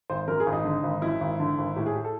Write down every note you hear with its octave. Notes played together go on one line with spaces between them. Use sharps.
G#1 C5
F#2 A#4
G#4
G#1
D#4
D3
G#1
F#2 E4
G#1
D3
G#1
A2 G4
G#4
G4
A4